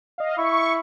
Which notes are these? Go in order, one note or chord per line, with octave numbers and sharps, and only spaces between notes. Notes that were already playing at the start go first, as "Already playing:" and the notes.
D#5 F5
E4 C#6